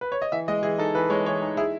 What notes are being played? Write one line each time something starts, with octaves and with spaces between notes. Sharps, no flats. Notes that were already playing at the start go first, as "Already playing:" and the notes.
B4
C#5
D#5
E3 E5
G#3 D#5
E3 G#4
D#4 A4
E3 B4
G#3 C#5
E3 C#5
D#4
E4 G#4